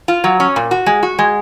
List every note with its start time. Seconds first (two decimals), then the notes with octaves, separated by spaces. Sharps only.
0.08 F4
0.24 F#3
0.40 C#4
0.56 A#2
0.71 F#4
0.86 G#3
1.03 F#4
1.19 G#3